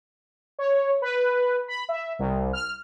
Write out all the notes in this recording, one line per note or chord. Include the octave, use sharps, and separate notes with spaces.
C#5
B4
B5
E5
C2
F6